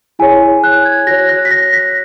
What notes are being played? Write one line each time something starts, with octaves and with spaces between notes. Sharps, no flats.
E4 G#4 C#5 G#5
F#6
G#6
F#4 C#5 A#6
F#6
B6
A#6
B6